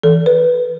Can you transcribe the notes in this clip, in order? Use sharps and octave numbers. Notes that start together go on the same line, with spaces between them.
E3 A4
B4